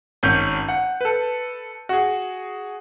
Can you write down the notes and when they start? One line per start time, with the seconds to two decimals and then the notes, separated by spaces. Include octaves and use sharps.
0.23 G#1 C#4 G6
0.69 F#5
1.01 A4 B4
1.89 F#4 G#4